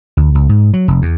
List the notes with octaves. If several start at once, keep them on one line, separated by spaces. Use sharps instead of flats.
D2
C#2
G#2
F#3
F1
E2